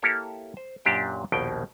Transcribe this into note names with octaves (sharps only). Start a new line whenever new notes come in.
A#3 E4 G4 A4 C#5
C5
F#2 A#2 D4 G4 E5 G5
A#1 D#2 B2 G5